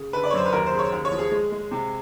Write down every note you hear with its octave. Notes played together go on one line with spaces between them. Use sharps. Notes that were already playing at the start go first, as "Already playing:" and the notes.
Already playing: C#3
D3 B4
D5
C#5
F#2 C5
B4
D#2 A#4
C5
C#3
C#5
D#2
C#5
F3
G#4
G#3
G#3
C3